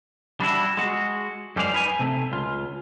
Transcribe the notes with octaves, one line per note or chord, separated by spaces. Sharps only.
G3 D4 E4 F#4
G#3 F#4
F#2 G3 G#3 C5 D5 F5
D#4 B4 G#5
C3 A3
C#2 F4